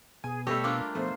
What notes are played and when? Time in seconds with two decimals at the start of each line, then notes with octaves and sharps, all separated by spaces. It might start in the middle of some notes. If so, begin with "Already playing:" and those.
0.24 B2 B3 G#4 G#5
0.47 G3 A3 G4 A4 C#5 D#5 E6
0.64 A#3 D4 F4
0.95 B2 F3 A3 C5